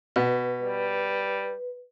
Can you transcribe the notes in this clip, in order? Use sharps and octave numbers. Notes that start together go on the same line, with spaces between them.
B2 B4
G3